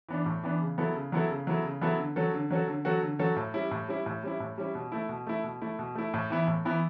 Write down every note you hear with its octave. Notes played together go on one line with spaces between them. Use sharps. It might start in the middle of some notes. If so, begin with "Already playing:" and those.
E3 B3 D4
A2
E3 B3 D4
C#3
F#3 B3 E4 A4
C#3
F#3 B3 E4 A4
C#3
F#3 B3 E4 A4
C#3
F#3 B3 E4 A4
D3
F#3 C#4 F#4 A4
D3
F#3 C#4 F#4 A4
D3
F#3 C#4 F#4 A4
D3
F#3 C#4 F#4 A4
A2
G3 C#4 E4
A2
G3 C#4 E4
A2
G3 C#4 E4
A2
G3 C#4 E4
B2
A3 E4
B2
A3 E4
B2
A3 E4
B2
A3 E4
A2
E3 B3 E4
A2
E3 B3 E4